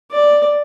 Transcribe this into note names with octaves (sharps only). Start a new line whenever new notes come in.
D5